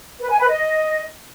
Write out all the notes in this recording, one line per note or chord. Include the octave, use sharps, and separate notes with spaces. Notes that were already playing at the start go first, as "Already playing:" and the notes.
B4
G#5
B4
D#5